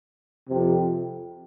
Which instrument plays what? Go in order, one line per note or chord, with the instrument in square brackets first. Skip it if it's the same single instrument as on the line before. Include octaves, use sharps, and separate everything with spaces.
[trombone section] F2 C3